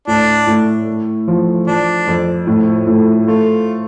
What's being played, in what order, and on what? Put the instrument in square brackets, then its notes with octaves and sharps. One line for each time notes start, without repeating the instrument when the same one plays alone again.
[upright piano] A2 [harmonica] D4
[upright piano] A2
A3
F3
[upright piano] F3 [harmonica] D4
[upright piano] F2
A2
A2
[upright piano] A3 [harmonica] F4